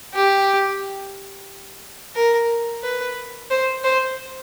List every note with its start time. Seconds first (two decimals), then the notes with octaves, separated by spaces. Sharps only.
0.15 G4
2.16 A#4
2.83 B4
3.50 C5
3.84 C5